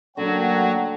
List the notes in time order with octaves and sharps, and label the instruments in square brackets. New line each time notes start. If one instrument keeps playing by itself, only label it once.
[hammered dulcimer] D3 [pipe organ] F#3 F#4 [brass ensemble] A3 F#5 G5 [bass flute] A#3